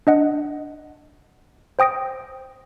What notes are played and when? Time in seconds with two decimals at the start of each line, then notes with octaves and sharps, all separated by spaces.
0.07 D4 D#5 F#5
1.79 C5 G5 D#6 A#6 D7